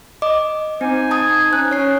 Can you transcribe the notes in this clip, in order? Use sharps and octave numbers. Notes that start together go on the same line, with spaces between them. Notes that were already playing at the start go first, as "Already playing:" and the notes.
D#5 D6
C4 D#4 C5 G#5
A5 D#6 G#6
C#4 D#4 F#6
C#4 C#5 C7